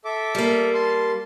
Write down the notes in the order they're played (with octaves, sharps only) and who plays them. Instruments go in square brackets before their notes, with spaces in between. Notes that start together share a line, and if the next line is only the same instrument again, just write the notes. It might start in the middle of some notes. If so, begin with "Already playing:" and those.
[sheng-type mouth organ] A4 E5 D6
[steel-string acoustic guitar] G3 A#3
[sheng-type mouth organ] A5 C6